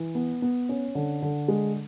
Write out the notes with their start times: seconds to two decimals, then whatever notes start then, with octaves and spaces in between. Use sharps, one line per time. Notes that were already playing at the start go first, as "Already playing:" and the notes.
Already playing: E3
0.15 B3
0.42 B3
0.69 C#4
0.95 D3
1.22 D3
1.48 G#3